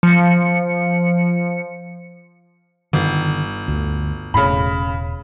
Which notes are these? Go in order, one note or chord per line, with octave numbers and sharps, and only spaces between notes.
F3 C#7
G1 D3 D#3 G3
D2
E1 A2 C#3 B5